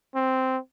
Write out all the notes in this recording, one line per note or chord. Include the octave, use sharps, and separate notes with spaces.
C4